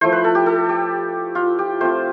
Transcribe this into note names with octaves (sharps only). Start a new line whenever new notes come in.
F3 A3 E4 C5
B4
A4
G4
A4
G4
F4
G4
A3 C4 F4 C5